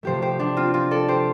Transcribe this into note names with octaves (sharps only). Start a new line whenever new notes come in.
C3 F3 A3 G4 C5
G4 C5
D4 G4
C4 F4
C4 F4
A4 D5
G4 C5